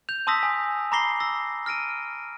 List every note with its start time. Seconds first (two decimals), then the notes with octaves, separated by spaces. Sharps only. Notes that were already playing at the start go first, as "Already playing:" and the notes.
0.09 G6 F7
0.27 A5 C6 D#6 E6 A#6 B6
0.43 G#5
0.92 A#5 B5 D6 A#6 C7 G7
1.20 E6 A#6
1.66 F6 A#6 D7 D#7